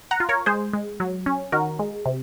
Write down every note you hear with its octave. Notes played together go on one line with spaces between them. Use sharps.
F#5 A#5
F4
A#4 C#5
G#3 G#4 C5
G#3
F#3
C#4
D#3 F#4 A#4
G#3
C3